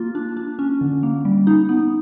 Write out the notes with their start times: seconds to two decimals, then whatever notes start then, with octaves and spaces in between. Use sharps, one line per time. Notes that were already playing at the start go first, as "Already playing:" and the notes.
Already playing: A#3 F4
0.15 D4
0.37 D4
0.59 C#4
0.81 D3
1.03 A#3
1.25 G3
1.47 D#4
1.69 B3